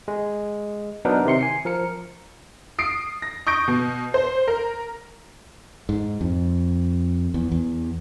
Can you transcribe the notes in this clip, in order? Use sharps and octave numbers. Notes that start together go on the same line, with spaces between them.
G#3
F#3 B3 D4 D#4 A#4 B4
C3 D#3 C6 C#7
G#5 C7 C#7
F3 A#4 C#7
D#6 C7 D7
A#6
C#6 D#6 G6 A#6 D7
B2
C5
A#4
G#2
F2
E2
E2